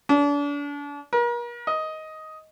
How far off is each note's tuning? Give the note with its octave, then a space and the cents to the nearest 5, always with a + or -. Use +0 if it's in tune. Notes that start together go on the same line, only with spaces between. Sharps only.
D4 -35
A#4 +40
D#5 +10